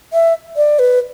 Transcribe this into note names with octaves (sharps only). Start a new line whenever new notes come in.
E5
D5
B4